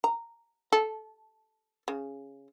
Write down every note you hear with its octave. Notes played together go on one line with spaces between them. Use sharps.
A#5
A4
C#3